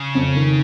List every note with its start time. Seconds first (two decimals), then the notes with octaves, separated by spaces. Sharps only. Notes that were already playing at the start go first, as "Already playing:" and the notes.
Already playing: C#3
0.15 F2
0.35 D#3